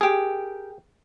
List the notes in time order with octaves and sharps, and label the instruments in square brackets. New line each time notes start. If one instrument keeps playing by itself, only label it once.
[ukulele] G4 A#4 [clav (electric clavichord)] G#4